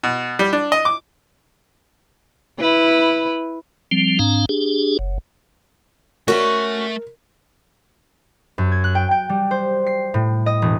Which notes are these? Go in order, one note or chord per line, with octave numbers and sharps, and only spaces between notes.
B2
G3
D4
D#5
D6
E4 B4
F3 G3 C4
G#2 C4 D4 F5 A#5
D4 G4 G#4
F#1
A3 C#4 F#4 A#4 E5
F#2
G#6
F#6
G5
G5
G3
C5
C7
A2
D#5
E1